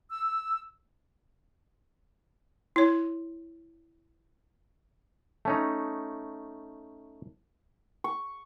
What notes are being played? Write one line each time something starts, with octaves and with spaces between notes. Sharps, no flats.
E6
E4 C#5
A3 C#4 D#4
C#6